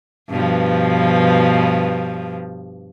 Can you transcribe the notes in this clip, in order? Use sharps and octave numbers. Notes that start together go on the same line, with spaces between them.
G2 B2 F3